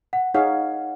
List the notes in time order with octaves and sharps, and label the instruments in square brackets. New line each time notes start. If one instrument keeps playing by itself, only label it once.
[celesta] F#5
[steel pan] D#4 G#4 C#5 F5 [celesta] F#5